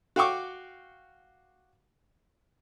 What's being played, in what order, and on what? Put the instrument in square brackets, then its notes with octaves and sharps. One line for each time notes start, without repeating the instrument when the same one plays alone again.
[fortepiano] F#4 F5 G5 C#6 D6